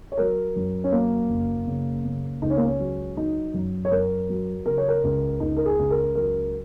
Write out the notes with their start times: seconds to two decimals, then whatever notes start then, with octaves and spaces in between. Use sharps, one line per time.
0.12 C#5
0.17 F#3 A#4
0.56 F#2
0.84 C#4
0.92 F#3 A#3
1.29 F#1
1.67 C#3
2.05 C#3
2.42 C#2 D#4
2.50 C#4
2.57 A#3
2.64 C#4
2.79 F#3
3.16 F#3 D#4
3.54 F#2
3.85 C#5
3.91 F#2 A#4
4.29 F#3
4.66 C#3 A#4
4.78 C#5
4.88 A#4
5.04 C#2
5.40 C#2 D#4
5.57 A#4
5.66 G#4
5.79 C#2
5.90 A#4
6.15 F#3 A#4